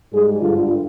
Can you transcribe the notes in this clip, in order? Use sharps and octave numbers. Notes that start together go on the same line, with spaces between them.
G#2 G3 G#4
G2 D3 G3 F4